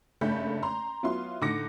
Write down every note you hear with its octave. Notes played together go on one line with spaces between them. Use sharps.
F#1 G2 A3 B5 G6
A#5 C6
F#3 B3 E4 F4 C6
A2 D3 D#4 D6 A#6 C#7